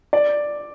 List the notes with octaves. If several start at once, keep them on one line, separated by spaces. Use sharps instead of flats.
D5